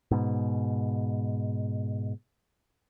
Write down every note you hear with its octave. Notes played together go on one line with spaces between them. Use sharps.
G#2 B2